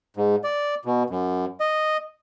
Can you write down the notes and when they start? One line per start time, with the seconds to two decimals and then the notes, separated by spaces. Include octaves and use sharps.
0.17 G#2
0.44 D5
0.85 B2
1.10 F#2
1.60 D#5